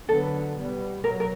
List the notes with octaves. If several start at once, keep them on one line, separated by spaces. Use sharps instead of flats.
D3 F#3 B3 A4
B2 G3 B3
B2 F#3 A#4
A#4